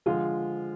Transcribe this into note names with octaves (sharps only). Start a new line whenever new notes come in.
D3 F3 G#3 F4